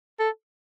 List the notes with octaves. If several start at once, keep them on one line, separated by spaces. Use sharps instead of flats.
A4